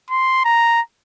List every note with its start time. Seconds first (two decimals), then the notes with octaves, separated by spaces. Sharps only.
0.10 C6
0.45 A#5